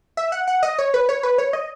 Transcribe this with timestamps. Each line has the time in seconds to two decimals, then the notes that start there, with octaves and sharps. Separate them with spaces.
0.17 E5
0.32 F#5
0.48 F#5
0.63 D#5
0.79 C#5
0.94 B4
1.09 C#5
1.23 B4
1.38 C#5
1.53 D#5